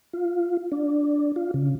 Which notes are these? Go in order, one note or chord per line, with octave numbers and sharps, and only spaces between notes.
F4
D4
F4
C#3